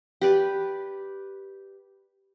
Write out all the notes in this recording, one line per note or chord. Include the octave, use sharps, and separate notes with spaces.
G4 B4 D5